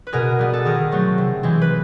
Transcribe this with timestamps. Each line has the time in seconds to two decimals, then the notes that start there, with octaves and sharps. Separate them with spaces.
0.07 B4
0.13 B2 G#4 A#4
0.39 G3 B3
0.53 A4
0.65 D#3 G#4 A#4
0.92 F#3 A3 C4
1.18 C3
1.43 E3 G#3 C4
1.61 B4